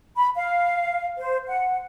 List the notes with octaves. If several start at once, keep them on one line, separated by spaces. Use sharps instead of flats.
B5
F5
C5
F#5